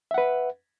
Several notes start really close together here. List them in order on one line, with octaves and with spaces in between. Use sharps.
E5 F#5 B4